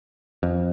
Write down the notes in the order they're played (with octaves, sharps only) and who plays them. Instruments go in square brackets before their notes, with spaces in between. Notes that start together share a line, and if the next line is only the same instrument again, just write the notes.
[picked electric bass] F2